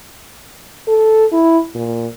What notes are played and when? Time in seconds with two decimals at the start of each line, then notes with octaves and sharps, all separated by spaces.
0.88 A4
1.32 E4
1.75 A#2